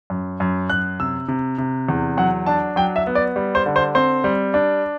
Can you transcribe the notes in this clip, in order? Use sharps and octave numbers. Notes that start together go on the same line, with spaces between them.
F#2
F#2
F#2 F#6
C3 E6
C3
C3
E2
F#3 F#5
D4 A5
F#3 G5
E5
B3
D5
G3
C5
D3
C5
C4 C5
G3
D4